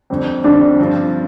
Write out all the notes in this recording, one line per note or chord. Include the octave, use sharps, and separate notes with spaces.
F2 D3 G3 C4
F2 D3 G3 C4 D4
G2 F3 C4